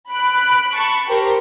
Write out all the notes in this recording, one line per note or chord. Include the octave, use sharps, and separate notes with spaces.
B5 F#6 D7
A5 B5 C#6
G4 A#4 C5